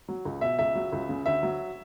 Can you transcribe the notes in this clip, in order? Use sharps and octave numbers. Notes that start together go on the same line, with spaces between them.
F#3
C#2
B2 E5
C#2 E5
F#3
C#2
C#3
D2 E5
F#3